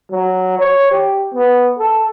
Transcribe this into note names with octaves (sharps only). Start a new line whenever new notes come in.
F#3
C#5
G4
B3
A4